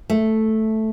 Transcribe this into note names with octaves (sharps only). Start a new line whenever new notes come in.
A3